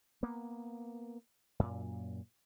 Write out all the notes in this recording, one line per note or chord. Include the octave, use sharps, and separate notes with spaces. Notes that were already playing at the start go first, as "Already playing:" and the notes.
A#3 B3
F#2 A#2